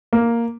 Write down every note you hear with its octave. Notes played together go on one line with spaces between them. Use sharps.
A#3